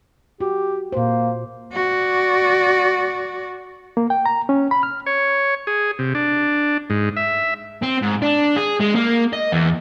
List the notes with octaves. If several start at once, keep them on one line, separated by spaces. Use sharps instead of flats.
F#4 G4
A#2 A#3 C5
F#4 D5
A#3
G5
A#5
C#4
B5
F6
C#5
G#4
C3
D4
G#2
E5
C4
G#2
D4
G#4
G#3
A#3
D#5
E2